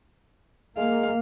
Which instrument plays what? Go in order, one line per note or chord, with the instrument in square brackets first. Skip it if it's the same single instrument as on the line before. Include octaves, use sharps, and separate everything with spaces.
[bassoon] G#3 [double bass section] A#3 [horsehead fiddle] F5